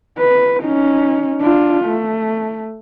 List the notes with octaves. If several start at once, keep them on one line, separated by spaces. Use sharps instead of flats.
B4
C#4 D#4
D4 F4
A3